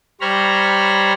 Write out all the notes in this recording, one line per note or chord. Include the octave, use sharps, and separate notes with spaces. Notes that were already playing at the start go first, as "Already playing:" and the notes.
G3 C5 C#5 A#5 B5 F6